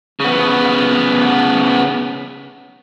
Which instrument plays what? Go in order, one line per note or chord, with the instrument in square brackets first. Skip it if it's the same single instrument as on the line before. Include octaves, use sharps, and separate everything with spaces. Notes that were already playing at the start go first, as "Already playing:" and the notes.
[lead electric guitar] C#3 B3